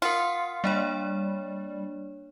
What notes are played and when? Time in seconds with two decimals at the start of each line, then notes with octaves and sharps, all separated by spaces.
0.02 F4 A#4 F#5 C7
0.64 G3 A#3 D4 C#5